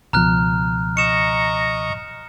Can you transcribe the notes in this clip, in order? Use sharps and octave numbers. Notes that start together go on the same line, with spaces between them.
C#2 B2 F3 A#5 F6 F#6
D#5 A#5 C#6 C#7 E7